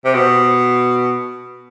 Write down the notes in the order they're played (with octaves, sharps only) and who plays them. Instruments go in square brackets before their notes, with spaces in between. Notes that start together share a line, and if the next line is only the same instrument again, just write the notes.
[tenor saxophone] C3
B2